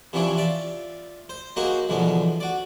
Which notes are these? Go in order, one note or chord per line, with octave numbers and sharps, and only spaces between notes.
C3 E3 F3 C#4 D4 E4
F4 D5 E5
C5
F#3 A#3 D#4 F#4 G#4 C5
B1 E2 D3 F3 G#3
F#4 D5